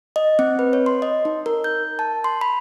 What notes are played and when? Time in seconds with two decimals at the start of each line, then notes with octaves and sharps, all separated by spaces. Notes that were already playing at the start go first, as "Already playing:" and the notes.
0.16 D#5
0.39 C4
0.59 B4
0.73 C#5
0.86 C6
1.02 D#5
1.25 D#4
1.46 A#4
1.64 G6
1.99 A5
2.24 C6
2.41 B5